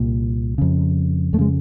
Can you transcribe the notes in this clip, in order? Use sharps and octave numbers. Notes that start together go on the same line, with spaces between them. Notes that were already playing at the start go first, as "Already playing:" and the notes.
Already playing: C2 A#2
F2 C#3
F2 A3
C#3 G#3